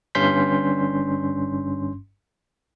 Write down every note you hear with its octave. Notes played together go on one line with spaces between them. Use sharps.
G1 G2 C#4 C6 G6 B6